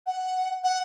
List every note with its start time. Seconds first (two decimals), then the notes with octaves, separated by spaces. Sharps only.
0.07 F#5
0.64 F#5